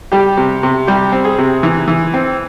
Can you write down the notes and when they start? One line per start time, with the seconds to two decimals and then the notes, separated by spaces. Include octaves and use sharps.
0.12 G3 G4
0.37 C3
0.63 C3
0.87 G3 G4
1.12 C4
1.25 G#4
1.38 C3
1.63 E3
1.88 E3
2.14 C4